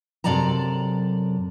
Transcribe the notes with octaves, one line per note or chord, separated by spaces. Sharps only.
F#2 C3 A4 D5 A5 A#5